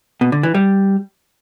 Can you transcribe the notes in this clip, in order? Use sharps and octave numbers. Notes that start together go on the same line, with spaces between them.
B2
D3
E3
G3